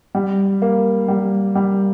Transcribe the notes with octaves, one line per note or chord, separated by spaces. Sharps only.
G3
A#3
G3
G3